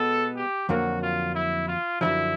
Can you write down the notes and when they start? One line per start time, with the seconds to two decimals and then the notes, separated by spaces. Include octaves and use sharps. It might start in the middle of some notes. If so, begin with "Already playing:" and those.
Already playing: B2 G#3 B3 A4
0.36 G4
0.69 F2 D3 F#3 A#3 F#4
1.02 F4
1.35 E4
1.68 F4
2.01 F#2 D3 F3 E4